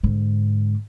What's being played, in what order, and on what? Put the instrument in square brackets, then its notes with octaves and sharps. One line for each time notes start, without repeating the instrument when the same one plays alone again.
[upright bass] G#2 D3